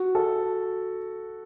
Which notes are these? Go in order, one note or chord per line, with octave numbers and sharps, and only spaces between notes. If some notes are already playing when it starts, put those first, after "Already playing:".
Already playing: F#4
A4